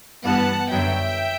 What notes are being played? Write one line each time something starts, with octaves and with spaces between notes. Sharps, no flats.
G2 E3 G3 B3 F#5 A5
F#2 D3 F#3 B3 E5 G5